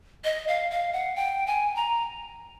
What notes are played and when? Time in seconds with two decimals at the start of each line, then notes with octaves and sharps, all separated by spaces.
0.24 D#5
0.48 F5
0.71 F5
0.93 F#5
1.16 G5
1.47 G#5
1.76 A#5